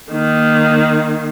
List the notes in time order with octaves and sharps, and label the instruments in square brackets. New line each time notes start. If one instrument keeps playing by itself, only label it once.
[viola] D#3 A#3